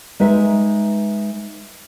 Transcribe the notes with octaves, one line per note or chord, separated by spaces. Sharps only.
G#3 D#4 B4 E5